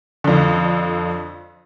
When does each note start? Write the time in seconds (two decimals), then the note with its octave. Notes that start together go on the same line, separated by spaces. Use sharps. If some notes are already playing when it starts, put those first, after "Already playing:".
0.24 F2 D3